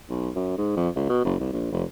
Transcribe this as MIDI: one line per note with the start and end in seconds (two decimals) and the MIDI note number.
0.09 0.30 35
0.36 0.54 42
0.57 0.74 44
0.77 0.89 41
0.96 1.08 37
1.09 1.22 47
1.25 1.35 30
1.40 1.52 36
1.53 1.70 34
1.72 1.84 29